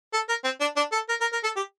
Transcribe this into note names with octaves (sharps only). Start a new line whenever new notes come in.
A4
A#4
C4
D4
D4
A4
A#4
A#4
A#4
A4
G4